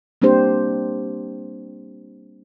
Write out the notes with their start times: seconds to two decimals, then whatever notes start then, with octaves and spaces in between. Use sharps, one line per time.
0.22 G3 A#3 C4 D4 G4 C5